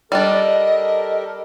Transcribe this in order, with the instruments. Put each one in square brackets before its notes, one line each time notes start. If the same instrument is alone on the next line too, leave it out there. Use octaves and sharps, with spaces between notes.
[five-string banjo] G3 D4 [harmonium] G4 A4 A#4 [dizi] D#5